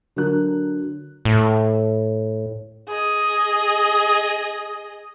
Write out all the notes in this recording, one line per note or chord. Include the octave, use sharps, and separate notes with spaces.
D3 F#3 A#4 F#6
A2
G#4 D#5